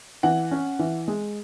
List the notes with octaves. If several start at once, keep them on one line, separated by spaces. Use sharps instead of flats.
E3 F#5
C#4
E3
G#3